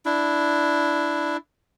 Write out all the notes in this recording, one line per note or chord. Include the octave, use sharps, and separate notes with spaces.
D4 E4